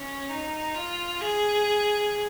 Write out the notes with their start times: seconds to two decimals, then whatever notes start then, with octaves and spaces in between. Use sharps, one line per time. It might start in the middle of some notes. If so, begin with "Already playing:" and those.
Already playing: C#4
0.29 D#4
0.75 F4
1.21 G#4